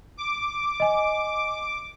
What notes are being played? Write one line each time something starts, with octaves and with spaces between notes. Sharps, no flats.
D6
D#5 G#5